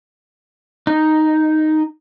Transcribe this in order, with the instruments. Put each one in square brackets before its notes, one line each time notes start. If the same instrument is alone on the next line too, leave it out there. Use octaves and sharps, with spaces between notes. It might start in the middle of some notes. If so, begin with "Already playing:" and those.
[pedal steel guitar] D#4